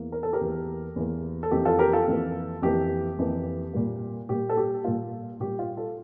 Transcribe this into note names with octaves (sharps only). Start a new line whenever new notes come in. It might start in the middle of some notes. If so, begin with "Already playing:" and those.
Already playing: E2 E3 A#3
A#4
A4
G4 A#4
E2 E3 A#3
E2 E3 A#3
A4
F2 E3 A#3 G4
F4 A4
G4 A#4
F4 A4
F2 E3 A#3
F2 E3 A#3 G4
F2 E3 A#3
A#2 G3 A#3
A#2 G3 A#3 G4
A4
G4
A#2 G3 A#3 F4
A#2 G3 A#3 G4
F4
F4 A4